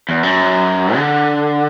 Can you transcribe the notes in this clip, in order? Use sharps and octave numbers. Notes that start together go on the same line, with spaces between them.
E2
F#2
D3